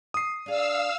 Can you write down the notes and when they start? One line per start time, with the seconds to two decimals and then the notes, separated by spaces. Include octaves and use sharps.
0.14 D#6 C7
0.46 D4 G#4 F5 E6